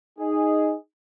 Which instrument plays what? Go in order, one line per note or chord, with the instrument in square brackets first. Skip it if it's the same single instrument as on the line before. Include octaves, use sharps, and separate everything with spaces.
[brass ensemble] D#4 G#4